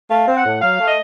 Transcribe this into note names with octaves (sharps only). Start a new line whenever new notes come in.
A3 F5
C4
F#5
A2
F#3 F5
A3
D#5